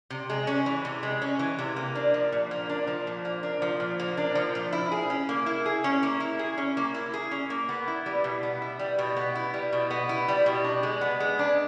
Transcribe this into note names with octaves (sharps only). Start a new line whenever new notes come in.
C3
G#3
C#4
E3
C3
G#3
C#4
E3
C3
A#3
D4
F3
A#2
A#3
D4
F3
A#2
A#3
D4
F3
A#2
A#3
D4
F3
A#2
E4
G#4
C#4
A#3
E4
G#4
C#4
A#3
E4
G#4
C#4
A#3
E4
G#4
C#4
A#3
B3
E4
G3
B2
B3
E4
G3
B2
B3
E4
G3
B2
B3
E4
G3
B2
D4
G#3
B3
G#3
D4